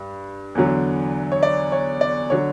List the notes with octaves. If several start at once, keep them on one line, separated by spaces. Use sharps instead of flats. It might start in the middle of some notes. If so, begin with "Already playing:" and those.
Already playing: G2
E2 D3 F#3
C#5
D5
C#5
D5
D3 F#3 C#5